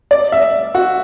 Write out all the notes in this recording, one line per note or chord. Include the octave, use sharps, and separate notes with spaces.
D5
E5
F#4